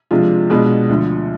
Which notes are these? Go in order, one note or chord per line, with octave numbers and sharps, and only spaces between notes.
C3 F3 G#3 D4 F4
B2 G#3 B3 D4 F4
D2 D3 F3